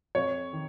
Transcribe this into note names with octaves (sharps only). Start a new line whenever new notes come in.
F2 C#5
D#3